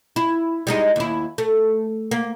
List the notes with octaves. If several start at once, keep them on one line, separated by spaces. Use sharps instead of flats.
E4
G3 G#3 D#4
D#2 E4
A3
A#3